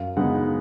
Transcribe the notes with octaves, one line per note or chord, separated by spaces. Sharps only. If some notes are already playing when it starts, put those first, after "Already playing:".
Already playing: F#2 F5
C#3 G#3 B3 D#4 F#5